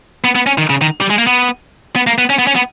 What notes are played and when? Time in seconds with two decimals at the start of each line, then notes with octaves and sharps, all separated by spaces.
0.24 B3
0.35 B3
0.47 C#4
0.58 D#3
0.70 C#3
0.81 D#3
1.01 G3
1.10 G#3
1.18 A#3
1.27 B3
1.96 B3
2.07 A#3
2.18 B3
2.30 C#4
2.39 B3
2.47 C#4
2.56 B3